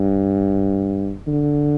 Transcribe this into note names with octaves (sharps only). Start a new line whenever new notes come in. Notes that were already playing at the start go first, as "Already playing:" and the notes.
Already playing: G2
D3